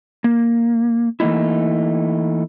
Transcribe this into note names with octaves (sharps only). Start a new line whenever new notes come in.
A#3
E3 A3 A#3 D#4 E4